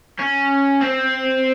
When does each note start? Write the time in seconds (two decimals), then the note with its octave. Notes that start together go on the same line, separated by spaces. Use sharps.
0.19 C#4
0.82 C4